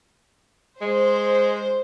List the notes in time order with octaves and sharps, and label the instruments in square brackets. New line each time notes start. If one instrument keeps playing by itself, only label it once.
[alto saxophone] G#3 [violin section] C5